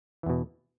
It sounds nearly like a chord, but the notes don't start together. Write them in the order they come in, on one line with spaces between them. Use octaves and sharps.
E3 E2 B2